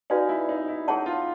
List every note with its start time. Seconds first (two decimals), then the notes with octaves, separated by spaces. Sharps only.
0.10 D#4 F#4 B4 D5 F5 G#5
0.29 E4
0.49 D#4
0.68 E4
0.88 D#4 G#4 C#5 F#5 A5
1.06 F4